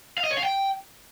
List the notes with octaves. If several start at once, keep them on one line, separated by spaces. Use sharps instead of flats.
F5
D#5
C#5
F5
G5